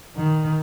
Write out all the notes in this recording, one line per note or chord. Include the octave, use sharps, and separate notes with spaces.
D#3